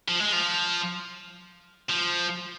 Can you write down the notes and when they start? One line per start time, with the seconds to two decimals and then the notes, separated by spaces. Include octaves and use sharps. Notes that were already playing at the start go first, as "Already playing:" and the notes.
0.08 F3
0.20 G#3
0.33 F3
1.90 F3